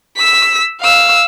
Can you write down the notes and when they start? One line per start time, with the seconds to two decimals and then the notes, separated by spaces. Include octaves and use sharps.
0.17 E6 B6
0.81 F5 E6